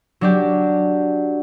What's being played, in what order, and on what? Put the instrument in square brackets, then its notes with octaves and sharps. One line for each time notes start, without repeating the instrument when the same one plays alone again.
[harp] F#3 D4 G4